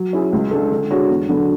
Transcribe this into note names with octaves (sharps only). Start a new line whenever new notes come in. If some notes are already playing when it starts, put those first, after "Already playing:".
Already playing: F#3
C#4 E4 G#4
C#2
C#3 G#3 D4 A4
D3
G#3 D4 F#4 C#5
E2
D3 F#3 B3 D4